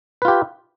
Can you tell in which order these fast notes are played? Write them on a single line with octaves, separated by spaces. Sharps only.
B4 F4 G4